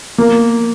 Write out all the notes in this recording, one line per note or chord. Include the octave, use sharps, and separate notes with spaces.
A#3